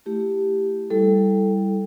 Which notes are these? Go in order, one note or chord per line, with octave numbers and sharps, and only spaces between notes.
A3 E4 G4
G3 E4 A4